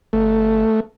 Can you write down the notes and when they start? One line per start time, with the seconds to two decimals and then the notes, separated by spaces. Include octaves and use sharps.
0.13 G1 A3